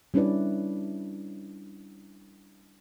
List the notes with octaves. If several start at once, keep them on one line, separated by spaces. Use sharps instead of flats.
G3 C#4 D4 E4 B4 D5